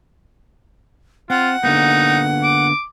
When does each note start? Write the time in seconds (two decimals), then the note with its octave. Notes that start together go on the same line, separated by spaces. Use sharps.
1.30 C4 F4 F#5
1.64 D3 A#3 B3 D#4
2.43 D6